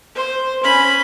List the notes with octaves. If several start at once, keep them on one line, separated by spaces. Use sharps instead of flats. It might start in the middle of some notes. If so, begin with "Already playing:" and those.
C5
C#4 B5